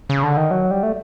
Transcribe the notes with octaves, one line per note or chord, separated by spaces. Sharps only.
C#3
D3
D#3
F#3
G3
A3